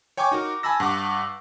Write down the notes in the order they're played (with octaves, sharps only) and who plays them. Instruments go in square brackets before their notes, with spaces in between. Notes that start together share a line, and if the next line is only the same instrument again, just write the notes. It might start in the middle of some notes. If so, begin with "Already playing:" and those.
[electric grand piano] C#5 G5 G#5 C#6 D6
D#4 F#4 A#4
G#5 A5 B5 E6 A#6
G2 F#5 D6